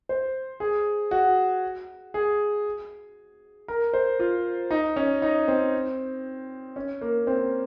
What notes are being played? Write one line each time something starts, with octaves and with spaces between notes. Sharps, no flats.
C5
G#4
F#4
G#4
A#4
C5
F4
D#4
C#4
D#4
C4
C#4
A#3
C4